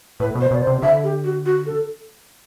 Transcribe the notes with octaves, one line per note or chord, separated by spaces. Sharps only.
A2 B4
B2
C5
B2 D5
C5
C3
D3 E5
G4
F#4
F#4
A4